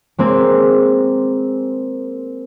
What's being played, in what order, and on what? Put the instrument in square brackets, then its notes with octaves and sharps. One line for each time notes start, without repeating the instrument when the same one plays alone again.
[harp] G#3 A#3 C4